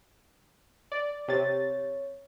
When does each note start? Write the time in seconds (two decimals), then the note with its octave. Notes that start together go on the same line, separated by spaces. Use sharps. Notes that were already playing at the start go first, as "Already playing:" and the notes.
0.92 D5
1.28 C3 C#5 A6